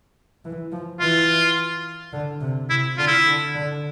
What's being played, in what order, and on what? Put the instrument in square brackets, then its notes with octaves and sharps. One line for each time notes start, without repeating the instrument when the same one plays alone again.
[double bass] E3
F3
[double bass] E3 [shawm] F4
[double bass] D3
C3
[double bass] C3 [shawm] E4
[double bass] D3 [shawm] F4
[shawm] E4
[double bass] D3
D3